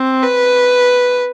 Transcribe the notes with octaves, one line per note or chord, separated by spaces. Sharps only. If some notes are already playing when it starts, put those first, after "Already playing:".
Already playing: C4
B4